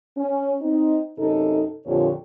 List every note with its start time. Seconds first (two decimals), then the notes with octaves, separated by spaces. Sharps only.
0.17 C#4
0.62 C4 D#4
1.19 F#2 C3 D#4 A4
1.86 F2 A#2 D3 G4 C#5